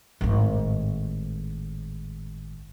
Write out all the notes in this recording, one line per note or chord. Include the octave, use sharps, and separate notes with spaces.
G#1 A2